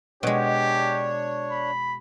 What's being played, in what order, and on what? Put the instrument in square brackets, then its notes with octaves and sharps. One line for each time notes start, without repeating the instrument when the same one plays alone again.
[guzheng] B2 G#3 [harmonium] D4 C#5 [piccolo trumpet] G4
[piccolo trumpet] B5